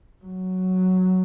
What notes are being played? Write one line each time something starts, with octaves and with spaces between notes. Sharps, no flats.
F#3